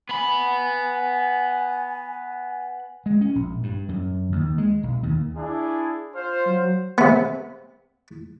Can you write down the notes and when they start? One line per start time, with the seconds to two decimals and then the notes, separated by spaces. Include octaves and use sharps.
0.09 B3 G#5 B5
3.06 G#3
3.21 C#4
3.35 A#1
3.63 G2
3.89 F#2
4.32 D#2
4.58 G#3
4.83 B1
5.03 D#2
5.36 D4 E4 G#4
6.14 F4 C5 F6
6.46 F#3
6.98 C3 B3